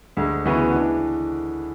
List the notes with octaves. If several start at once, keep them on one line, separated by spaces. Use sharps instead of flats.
D2 D3 G#3
D2 C#3 E3 B3 F#4
E3 G#3 D4